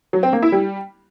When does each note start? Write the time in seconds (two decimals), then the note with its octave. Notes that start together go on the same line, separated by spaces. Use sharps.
0.13 F#3
0.23 C4
0.33 A#3
0.42 E4
0.52 G3